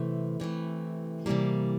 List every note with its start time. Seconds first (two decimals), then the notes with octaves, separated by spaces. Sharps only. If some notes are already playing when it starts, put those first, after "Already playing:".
Already playing: C3 E3 A3
0.40 C3 E3 A3
1.26 C3 E3 G3 A#3